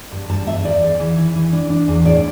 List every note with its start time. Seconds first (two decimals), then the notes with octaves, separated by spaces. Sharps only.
0.11 G2
0.29 G2 A5
0.47 B3 E5
0.64 E2 D5
0.82 E2
1.00 E3
1.17 E3
1.36 E3
1.53 D4
1.70 D4
1.88 E2
2.05 A2 D5